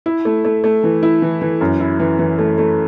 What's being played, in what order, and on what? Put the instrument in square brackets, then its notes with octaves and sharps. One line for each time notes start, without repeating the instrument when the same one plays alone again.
[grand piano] E4
A3
A3
A3
E3
E4
E3
E3
F#2
E4
E3
E3
A3
A3